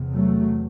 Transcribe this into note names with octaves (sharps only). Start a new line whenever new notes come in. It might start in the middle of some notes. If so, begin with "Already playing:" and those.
Already playing: E2 C3
F#3 A3